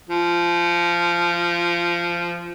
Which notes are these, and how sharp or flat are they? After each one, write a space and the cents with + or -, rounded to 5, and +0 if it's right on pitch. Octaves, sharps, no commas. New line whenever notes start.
F3 -15